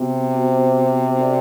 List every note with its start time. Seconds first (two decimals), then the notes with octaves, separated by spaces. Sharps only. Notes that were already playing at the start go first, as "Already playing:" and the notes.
Already playing: C3 B3 F#4 C5
0.34 B3 F#4 C5
1.17 D4 F#4 A4 D5